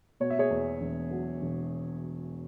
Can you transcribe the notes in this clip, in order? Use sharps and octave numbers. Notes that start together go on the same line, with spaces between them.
B2 C#5
E5
G#4 C#5
E2
E1
F#3
E1